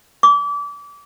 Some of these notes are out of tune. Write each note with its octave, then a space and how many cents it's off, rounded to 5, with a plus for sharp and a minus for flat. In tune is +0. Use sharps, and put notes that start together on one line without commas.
D6 -30